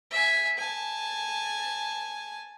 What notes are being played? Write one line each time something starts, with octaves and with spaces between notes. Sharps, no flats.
E5 G#5
G#5 A5